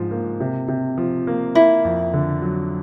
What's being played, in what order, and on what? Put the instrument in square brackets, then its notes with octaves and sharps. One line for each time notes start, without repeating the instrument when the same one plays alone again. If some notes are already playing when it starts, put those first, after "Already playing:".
Already playing: [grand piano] G#2 F3 D4
A#3
C3
C3
F3
A#3
[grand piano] A#3 [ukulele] E4
[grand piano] F2
D3
F#3